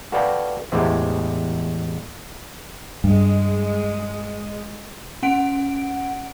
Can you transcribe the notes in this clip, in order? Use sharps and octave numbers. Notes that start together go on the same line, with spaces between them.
F#4 A4 B4 D5 F5 G5
E2 A2 G#3 G4 C5 E5
G2 G#3
C#4 F#5 D7